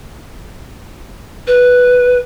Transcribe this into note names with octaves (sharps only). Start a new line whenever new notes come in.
B4